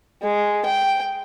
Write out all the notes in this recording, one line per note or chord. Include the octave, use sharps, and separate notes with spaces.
G#3
G5